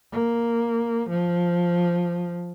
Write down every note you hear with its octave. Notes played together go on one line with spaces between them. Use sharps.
A#3
F3